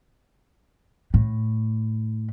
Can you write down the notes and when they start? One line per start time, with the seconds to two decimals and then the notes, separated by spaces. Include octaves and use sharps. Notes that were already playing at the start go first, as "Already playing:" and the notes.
1.14 A2